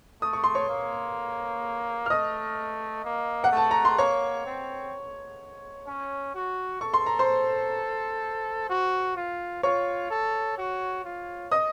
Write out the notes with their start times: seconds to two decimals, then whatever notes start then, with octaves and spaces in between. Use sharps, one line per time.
0.22 A3 D#6
0.33 C#6
0.44 C6
0.55 C#5 C#6
0.69 A#3
2.06 F6
2.10 A3 D#5 D#6
3.04 A#3
3.44 F#5
3.51 A3
3.57 A5
3.71 A#5
3.85 C6
3.98 A#3 C#5 C#6
4.46 C4
5.87 C#4
6.34 F#4
6.81 A4 C#6
6.94 C6
7.06 A#5
7.19 C5 C6
8.70 F#4
9.16 F4
9.63 F4 C#5 C#6
10.10 A4
10.58 F#4
11.05 F4
11.52 D#5 D#6